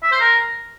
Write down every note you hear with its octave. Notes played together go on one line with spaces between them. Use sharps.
E5
C5
A#4